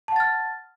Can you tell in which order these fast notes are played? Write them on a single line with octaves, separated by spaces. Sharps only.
A5 F#5 A6 F6